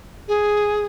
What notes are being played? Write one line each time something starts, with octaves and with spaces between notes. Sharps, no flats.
G#4